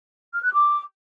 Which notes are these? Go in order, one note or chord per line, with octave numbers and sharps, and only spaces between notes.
F6
F#6
D6